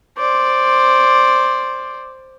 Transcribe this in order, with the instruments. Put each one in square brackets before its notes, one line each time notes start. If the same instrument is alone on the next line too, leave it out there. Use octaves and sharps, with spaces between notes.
[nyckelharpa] C5 D5